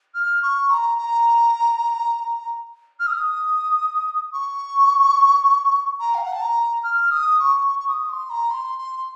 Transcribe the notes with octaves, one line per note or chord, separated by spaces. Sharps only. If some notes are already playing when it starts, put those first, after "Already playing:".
F6
C#6
A#5
A#5
F6
D#6
C#6
A#5
F5
F#5
A5
A#5
F6
D#6
C#6
C#6
C#6
D#6
C6
A#5
C6
C6